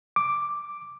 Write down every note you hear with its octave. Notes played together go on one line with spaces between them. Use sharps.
D6